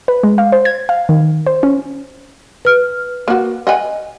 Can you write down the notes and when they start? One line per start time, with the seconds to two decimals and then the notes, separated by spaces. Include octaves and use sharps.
0.08 B4
0.23 G#3
0.38 F5
0.52 C5
0.65 G#6
0.89 F5
1.09 D#3
1.47 C5
1.63 C#4
2.65 B4 F6
3.28 A#3 F#4
3.67 D#5 F#5 G#5